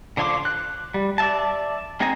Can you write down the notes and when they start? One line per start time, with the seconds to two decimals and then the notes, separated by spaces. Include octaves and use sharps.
0.17 D3 F3 C#5 C6 D6
0.45 F#6
0.94 G3
1.18 D5 E5 A5
2.00 G#3 C4 D#4 G#5 A#5